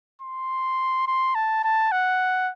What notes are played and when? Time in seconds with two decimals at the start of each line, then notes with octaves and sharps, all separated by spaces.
0.22 C6
1.07 C6
1.35 A5
1.64 A5
1.92 F#5